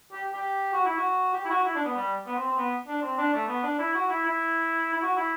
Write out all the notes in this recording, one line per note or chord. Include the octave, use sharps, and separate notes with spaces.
G4
G4
F#4
E4
F#4
G4
E4
F#4
E4
D4
B3
G3
B3
C4
C4
B3
D4
C4
D4
A3
B3
D4
E4
F#4
E4
E4
E4
F#4
E4